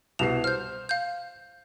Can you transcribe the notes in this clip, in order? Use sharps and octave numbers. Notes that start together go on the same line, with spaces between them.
C2 B2 C7 E7 F7
C5 F6 G6
F5 G6